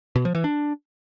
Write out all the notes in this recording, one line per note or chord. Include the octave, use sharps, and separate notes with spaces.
B2
F3
E3
D4